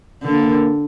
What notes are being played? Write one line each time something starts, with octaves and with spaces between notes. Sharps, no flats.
D3 A#3